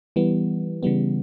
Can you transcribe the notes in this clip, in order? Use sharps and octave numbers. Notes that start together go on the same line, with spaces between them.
E3 G3 B3
C#3 E3 G3 B3